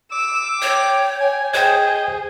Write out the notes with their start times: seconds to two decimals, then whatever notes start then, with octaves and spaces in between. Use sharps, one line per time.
0.12 D6 E6
0.62 C#5 G5
1.21 G#5
1.54 G#4 C5 D#5 G5 G#6